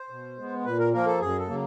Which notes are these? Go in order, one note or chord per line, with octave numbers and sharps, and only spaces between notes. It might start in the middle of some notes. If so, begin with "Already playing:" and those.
Already playing: C5
B2
G#3 B3
A#2 B4
A#4
F3 A#3 A#4
A4
F#2 G#4
A4
C#3 F#3 A#3